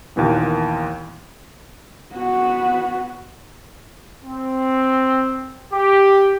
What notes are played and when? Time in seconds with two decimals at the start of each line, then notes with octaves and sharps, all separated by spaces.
0.16 D#2 A#2 E3 B3
2.15 B3 F#4
4.23 C4
5.71 G4